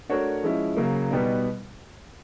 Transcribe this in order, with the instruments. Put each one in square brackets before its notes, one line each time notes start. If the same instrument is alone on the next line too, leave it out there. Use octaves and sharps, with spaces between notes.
[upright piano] A3 D4 F#4 A#4 C#5
F3 G#3 C#4 E4
C#3 F#3 A#3
B2 G3 B3 D#4